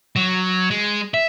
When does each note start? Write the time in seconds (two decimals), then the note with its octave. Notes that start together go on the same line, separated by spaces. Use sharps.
0.16 F#3
0.71 G#3
1.14 E5